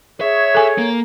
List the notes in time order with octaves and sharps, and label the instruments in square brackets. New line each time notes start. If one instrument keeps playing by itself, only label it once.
[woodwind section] G#4 C#5 [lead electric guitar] E5
[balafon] A4 G#5
[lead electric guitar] A#3